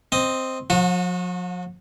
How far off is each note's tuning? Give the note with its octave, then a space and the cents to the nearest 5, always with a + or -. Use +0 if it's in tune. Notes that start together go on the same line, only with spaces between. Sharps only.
C4 +0 D#5 +0
F3 +45 F#4 -25